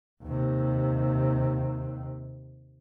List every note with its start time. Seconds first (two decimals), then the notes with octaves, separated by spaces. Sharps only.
0.24 D#2 C3